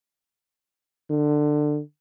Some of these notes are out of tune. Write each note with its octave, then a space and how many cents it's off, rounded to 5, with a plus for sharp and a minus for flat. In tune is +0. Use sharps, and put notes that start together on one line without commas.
D3 +20